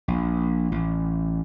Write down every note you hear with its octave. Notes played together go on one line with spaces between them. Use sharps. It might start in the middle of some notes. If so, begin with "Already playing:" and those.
A#1
A1